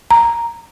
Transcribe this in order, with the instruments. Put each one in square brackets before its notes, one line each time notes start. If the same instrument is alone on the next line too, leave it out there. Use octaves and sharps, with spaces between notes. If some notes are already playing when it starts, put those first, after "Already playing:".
[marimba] A#5